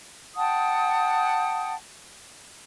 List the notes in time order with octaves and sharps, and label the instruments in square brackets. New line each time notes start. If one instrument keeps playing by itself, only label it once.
[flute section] F#5 G5 A5 D#6